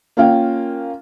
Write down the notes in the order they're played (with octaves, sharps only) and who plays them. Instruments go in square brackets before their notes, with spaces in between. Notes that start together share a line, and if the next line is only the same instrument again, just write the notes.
[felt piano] A#3 C#4 F4 F5 G5